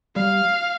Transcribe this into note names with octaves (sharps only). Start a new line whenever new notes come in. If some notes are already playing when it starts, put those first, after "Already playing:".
G3 F5